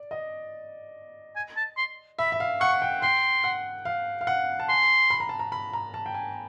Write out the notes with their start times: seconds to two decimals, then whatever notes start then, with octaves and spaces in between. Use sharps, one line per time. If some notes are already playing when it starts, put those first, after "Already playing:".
Already playing: D5
0.11 D#5
1.36 G#5
1.56 A5
1.77 C6
2.19 E5 B5
2.32 E5
2.40 F5
2.61 F#5 C#6
2.82 G5
3.02 G5 C6
3.44 F#5
3.85 F5
4.21 F5
4.27 F#5
4.60 A5
4.69 G#5 C6
5.10 B5
5.20 A#5
5.29 A5
5.39 A#5
5.52 B5
5.73 A#5
5.94 A5
6.06 G5
6.14 G#5